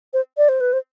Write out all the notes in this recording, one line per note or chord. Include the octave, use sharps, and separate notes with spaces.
C5
D5
C5
B4
C5